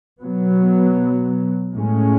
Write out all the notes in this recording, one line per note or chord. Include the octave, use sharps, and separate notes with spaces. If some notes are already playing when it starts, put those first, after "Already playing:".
B2 F#3 B3
A2 G#3 C#4